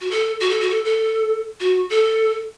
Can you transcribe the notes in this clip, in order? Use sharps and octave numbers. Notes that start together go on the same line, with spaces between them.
F#4
A4
F#4
A4
F#4
A4
A4
F#4
A4